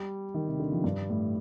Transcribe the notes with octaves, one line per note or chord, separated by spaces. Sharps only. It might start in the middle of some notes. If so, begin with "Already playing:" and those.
Already playing: G3
D#3
C3
D3
F3
G2
A2